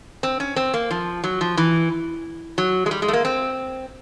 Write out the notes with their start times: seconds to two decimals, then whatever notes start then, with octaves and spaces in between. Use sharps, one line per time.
0.23 C4
0.40 C#4
0.56 C4
0.74 A#3
0.91 F3
1.24 F#3
1.41 F3
1.57 E3
2.58 F#3
2.86 G#3
2.91 G3
3.02 G#3
3.08 A3
3.13 A#3
3.25 C4